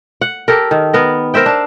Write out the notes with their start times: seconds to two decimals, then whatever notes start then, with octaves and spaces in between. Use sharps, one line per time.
0.21 F#5
0.48 G4 A4 A#4
0.71 D#3
0.94 B3 A#4
1.34 A#4 C5 E5 G5
1.46 D4